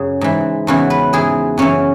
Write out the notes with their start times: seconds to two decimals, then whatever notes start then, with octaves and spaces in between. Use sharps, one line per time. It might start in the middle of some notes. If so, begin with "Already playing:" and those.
Already playing: F#2 C#3 G#4
0.21 G#2 E3
0.67 E2 C#3 E3 F#4
0.90 B4
1.13 G#2 E3 G#4
1.58 F#2 C#3 E3 C#4